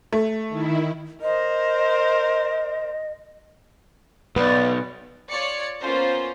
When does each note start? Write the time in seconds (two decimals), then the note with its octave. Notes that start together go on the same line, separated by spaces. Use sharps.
0.13 A3
0.49 D#3 E4
1.22 A#4 C5 D#5
4.36 B1 B3 D5
5.29 F4 C#5 D5 C#7
5.82 A#3 B3 C#4 F4 C5